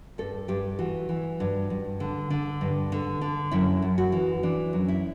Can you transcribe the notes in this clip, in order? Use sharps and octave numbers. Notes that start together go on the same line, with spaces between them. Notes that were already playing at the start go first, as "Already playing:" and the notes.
G2 A4
G2 G4
E3 F#4
E3
G2
G2
D3
D3
G2
D3
D3
F#2 E4
F#2
F#4
E3
E3 D4
F#2
E4